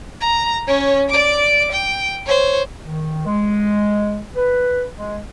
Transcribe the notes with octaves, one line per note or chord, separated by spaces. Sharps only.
A#5
C#4 C#5
D5 D6
G5
C5 C#5
D#3
G#3
B4
G#3